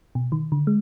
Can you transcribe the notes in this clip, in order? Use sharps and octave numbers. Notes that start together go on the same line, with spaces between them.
B2
D#3
D3
G#3